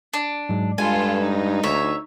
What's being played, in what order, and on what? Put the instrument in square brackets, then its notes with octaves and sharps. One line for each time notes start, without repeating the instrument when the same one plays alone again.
[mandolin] D4
[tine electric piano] G#2 F#3 G#3
[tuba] G2 [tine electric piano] G#3 [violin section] F4 A4 B4 [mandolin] G#5
[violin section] D#4
[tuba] D2 [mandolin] C#5 E5